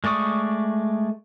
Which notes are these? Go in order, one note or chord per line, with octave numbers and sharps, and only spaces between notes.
G#3 A3 D5 C#6 D#6